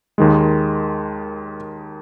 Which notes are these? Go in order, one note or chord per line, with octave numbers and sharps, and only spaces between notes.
D#2 D#3 G#3